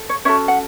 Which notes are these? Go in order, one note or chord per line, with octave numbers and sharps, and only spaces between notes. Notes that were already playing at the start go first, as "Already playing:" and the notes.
Already playing: A4
C#5
C#4 F#4 A4 C#5 E5
F#5